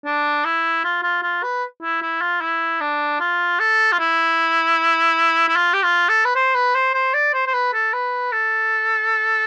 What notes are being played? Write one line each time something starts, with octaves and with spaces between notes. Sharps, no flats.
D4
E4
F4
F4
F4
B4
E4
E4
F4
E4
D4
F4
A4
F4
E4
E4
F4
G4
F4
A4
B4
C5
B4
C5
C5
D5
C5
C5
B4
A4
B4
A4